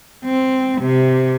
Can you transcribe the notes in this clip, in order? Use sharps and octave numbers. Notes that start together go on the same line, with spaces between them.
C4
C3